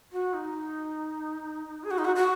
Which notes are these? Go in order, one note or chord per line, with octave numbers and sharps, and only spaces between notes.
F#4
D#4
G#4
F#4
D#4
F#4
F#4